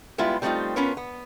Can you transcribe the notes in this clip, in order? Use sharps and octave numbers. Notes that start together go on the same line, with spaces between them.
G3 G#3 B3 E4 F4
G3 A3 C4 C#4 D#4 F4
B3 C#4 F4 A#4 B4 C#5
B3